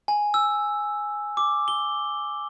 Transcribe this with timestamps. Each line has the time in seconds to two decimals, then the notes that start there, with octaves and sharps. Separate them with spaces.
0.08 G#5
0.34 E6
1.37 D6
1.68 G7